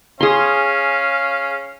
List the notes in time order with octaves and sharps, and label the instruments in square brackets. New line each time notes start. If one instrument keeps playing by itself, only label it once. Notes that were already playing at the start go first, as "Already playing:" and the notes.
[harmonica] C#4 F5 [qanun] G#4 C6